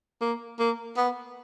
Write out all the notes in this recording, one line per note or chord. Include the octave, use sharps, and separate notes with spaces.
A#3
A#3
B3